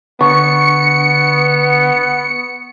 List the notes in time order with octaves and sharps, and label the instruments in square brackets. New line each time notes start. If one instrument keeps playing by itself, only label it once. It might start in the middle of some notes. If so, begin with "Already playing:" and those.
[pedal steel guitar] D3 [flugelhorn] B3 [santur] C#6 [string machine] C#7